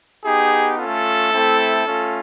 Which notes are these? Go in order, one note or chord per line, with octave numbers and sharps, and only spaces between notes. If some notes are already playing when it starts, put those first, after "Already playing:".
B3 D#4 G4 G#4
A3 C#4 F4 A4
A3 C4 E4
A3 C#4 F4